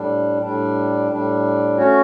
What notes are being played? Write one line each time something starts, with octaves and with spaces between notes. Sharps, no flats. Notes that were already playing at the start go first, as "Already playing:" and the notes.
Already playing: A2 G3 D4
A2 G3 D4
A2 G3 D4
A3 C#4 F#4 C#5